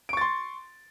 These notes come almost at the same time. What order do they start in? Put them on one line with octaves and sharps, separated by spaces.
D7 C#6 A6 C6